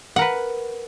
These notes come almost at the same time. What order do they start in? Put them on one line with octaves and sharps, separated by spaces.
F#5 A#4 B4